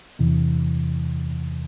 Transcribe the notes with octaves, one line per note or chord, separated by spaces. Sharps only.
E2 C3 E3